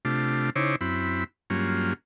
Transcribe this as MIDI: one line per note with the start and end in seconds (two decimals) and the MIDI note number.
0.05 0.50 48
0.05 0.50 57
0.05 0.50 62
0.05 0.50 65
0.56 0.76 49
0.56 0.76 63
0.56 0.76 64
0.56 0.76 72
0.56 0.76 73
0.56 0.76 86
0.81 1.24 42
0.81 1.24 60
0.81 1.24 64
0.81 1.24 83
1.50 1.93 43
1.50 1.93 54
1.50 1.93 58
1.50 1.93 61
1.50 1.93 65